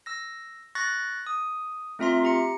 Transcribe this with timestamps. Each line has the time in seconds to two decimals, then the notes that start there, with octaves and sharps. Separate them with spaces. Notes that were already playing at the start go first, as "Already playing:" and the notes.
0.06 E6 A#6
0.75 C#6 F#6 A6 A#6
1.27 D#6
1.99 A3 C4 F4 E5 A#5 C6
2.23 G4 A#5 C#7